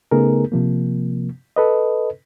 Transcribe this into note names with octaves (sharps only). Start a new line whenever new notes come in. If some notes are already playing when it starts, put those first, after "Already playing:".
C#3 A3 B3 D#4 G#4 A#4
C3 F3 A#3
A4 B4 D#5